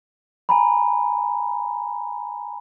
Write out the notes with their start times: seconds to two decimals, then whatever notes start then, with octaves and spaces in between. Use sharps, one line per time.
0.49 G#5 A#5 B5